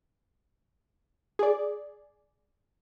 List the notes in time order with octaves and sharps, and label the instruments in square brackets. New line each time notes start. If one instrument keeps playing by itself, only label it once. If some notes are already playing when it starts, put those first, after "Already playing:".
[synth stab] G#4 D5